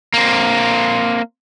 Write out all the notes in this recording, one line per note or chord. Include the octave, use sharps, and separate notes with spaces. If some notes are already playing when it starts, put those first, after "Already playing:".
A#3 C4